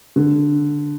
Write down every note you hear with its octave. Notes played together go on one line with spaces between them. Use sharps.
D3